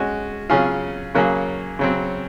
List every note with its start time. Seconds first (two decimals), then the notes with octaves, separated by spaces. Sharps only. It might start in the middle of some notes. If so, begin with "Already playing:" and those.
Already playing: G#3 C#4 F#4
0.50 C#3 F#3 C#4 F4 G#4
1.15 C#3 F#3 A#3 C#4 G#4
1.79 C#3 F#3 C4